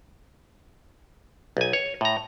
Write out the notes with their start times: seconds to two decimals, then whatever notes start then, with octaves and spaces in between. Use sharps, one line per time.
1.57 B1 G#5
1.73 C#5
2.01 A2 A#5